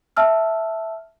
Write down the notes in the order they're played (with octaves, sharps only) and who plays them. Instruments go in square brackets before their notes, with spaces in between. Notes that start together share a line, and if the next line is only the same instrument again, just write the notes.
[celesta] E5 A5 E6 F6